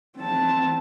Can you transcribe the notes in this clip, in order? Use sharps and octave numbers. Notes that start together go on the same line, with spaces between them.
C4 A5